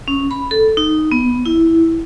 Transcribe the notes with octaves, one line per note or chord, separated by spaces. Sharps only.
C#4
B5
A4
D#4
B3
E4